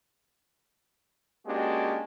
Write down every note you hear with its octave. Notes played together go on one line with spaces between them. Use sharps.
G#3 A#3 C#4 D4 F#4 G4